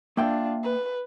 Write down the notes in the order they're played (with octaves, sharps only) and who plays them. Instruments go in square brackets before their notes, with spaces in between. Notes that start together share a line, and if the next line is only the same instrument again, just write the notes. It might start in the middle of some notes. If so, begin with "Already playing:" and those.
[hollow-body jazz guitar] A#3 E5 G5 [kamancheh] D4 F4
[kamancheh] B4